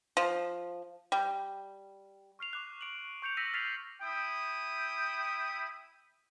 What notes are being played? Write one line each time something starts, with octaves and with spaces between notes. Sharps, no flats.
F3
G3
C#6 F6 C7 F7
C#6 D6 F#6
C#6 D7 F7 F#7
C#6 G6 C#7 F7
C#6 E6 A#6 B6 C#7 D#7
F6 A6 B6 C7 D#7 F7
E4 G5 D#6